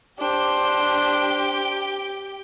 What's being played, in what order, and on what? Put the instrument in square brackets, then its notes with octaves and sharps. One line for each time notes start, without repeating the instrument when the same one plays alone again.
[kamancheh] D4 C5 [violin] G4 G5